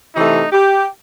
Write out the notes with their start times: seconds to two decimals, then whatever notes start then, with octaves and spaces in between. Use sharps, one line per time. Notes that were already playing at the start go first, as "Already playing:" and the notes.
0.15 C3 E3 A3 D#4
0.52 G4